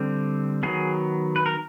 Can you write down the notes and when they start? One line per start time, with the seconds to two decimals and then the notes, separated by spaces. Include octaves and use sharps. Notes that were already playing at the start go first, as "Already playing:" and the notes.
Already playing: D3 G3 C4
0.63 D#3 F#3 B3 G#4
1.36 B4
1.46 A#4